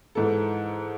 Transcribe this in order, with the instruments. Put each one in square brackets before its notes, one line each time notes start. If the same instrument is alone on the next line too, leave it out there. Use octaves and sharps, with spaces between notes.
[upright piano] G#2 E3 A4